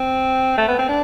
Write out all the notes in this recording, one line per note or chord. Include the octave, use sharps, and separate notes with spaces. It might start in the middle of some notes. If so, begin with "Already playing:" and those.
Already playing: C4
A3
B3
C4
D4